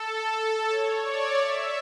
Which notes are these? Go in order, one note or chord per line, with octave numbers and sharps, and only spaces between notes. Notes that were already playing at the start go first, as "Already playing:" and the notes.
Already playing: A4
C#5
D5
E5